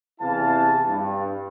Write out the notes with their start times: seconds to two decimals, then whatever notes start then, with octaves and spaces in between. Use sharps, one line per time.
0.20 E2 C3 E3 E4 F5 A5
0.88 G2